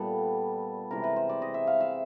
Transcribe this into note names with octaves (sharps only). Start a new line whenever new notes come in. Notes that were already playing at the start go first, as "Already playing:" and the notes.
Already playing: A#2 G3 B3 A4
C3 E3 G#3 A#4
B4
C5
D5
D#5
E5
F5
E5